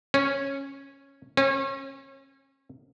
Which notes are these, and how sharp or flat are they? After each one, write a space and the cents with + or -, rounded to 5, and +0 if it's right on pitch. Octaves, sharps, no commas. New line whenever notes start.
C#4 -10
C#4 -35